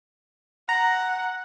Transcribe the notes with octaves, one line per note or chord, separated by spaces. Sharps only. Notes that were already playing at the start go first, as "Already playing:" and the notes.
F#5 A#5